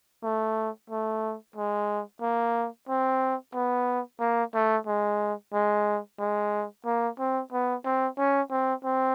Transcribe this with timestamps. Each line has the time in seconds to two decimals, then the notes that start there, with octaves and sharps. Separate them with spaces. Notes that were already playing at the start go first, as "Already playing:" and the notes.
0.24 A3
0.90 A3
1.56 G#3
2.22 A#3
2.89 C4
3.55 B3
4.21 A#3
4.55 A3
4.87 G#3
5.54 G#3
6.20 G#3
6.86 A#3
7.19 C4
7.53 B3
7.85 C4
8.19 C#4
8.51 C4
8.85 C4